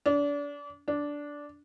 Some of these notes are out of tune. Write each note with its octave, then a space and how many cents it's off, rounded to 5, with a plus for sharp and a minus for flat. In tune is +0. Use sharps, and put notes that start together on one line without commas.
D4 -35
D4 -10